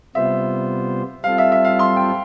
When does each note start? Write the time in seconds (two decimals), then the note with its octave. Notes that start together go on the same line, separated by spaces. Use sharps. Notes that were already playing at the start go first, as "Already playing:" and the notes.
0.15 C3 G3 B3 F4 C5 E5
1.24 G3 C4 F4 A4 F5
1.38 E5
1.52 E5
1.65 F5
1.79 C6
1.97 G5